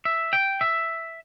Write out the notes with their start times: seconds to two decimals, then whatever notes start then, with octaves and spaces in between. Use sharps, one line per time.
0.05 E5
0.33 G5
0.61 E5